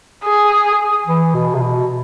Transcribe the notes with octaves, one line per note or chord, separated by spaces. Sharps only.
G#4
E3
B2
C3
B2